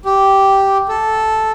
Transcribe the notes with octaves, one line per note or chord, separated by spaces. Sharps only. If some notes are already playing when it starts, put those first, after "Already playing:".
G4
A4